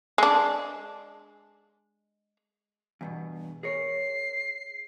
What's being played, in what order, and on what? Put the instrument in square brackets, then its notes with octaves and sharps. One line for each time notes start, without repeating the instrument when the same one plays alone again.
[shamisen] G#3 D4
[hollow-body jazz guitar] E2 G2 B2
[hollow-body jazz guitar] G#4 A#4 C#5 [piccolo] C7